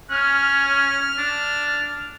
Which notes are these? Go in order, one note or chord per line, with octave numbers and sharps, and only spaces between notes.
C#4 F6
D4